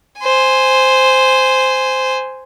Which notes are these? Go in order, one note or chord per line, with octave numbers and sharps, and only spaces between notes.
C5 G#5